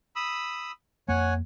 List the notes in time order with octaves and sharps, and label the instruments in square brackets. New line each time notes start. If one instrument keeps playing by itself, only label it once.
[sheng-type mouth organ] B5 D#6 E6
[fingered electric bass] F2 A#3 [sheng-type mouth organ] C#5 F#5 G#5